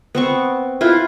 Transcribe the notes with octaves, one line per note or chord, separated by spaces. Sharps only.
B3 C4 C#6
E4 F4 B4